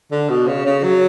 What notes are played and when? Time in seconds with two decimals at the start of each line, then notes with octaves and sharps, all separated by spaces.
0.11 D3
0.29 B2
0.47 C#3
0.65 C#3
0.83 F#3